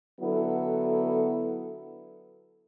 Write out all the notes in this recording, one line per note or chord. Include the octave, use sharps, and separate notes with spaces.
D3 F#3 B3 E4 A4